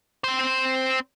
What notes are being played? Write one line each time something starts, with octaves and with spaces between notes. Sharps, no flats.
C4 C5